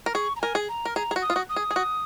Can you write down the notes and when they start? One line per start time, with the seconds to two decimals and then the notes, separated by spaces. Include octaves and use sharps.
0.06 A#4
0.14 G#4 C#6
0.36 A#5
0.41 A#4 G#5
0.55 G#4
0.69 A#5
0.85 A#4
0.96 G#4 A#5
1.11 G#4
1.16 F#4
1.22 D#6
1.30 F4
1.36 F#4
1.49 D#6
1.56 G#4
1.71 G#4
1.76 F#4